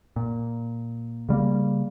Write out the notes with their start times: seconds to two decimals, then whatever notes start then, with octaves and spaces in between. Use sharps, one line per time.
0.16 A#2
1.29 C#3 G3 A3 A#3